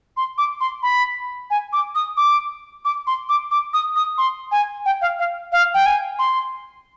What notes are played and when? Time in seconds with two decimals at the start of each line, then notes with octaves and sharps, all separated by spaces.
0.17 C6
0.38 D6
0.61 C6
0.83 B5
1.50 G#5
1.73 D6
1.95 D#6
2.17 D6
2.85 D6
3.07 C6
3.29 D6
3.51 D6
3.74 D#6
3.96 D#6
4.18 C6
4.51 G#5
4.86 G5
5.01 F5
5.19 F5
5.52 F5
5.74 G5
5.86 G#5
6.19 C6